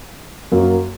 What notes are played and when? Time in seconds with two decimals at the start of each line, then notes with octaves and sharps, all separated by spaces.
0.52 F#2 F#3 A#3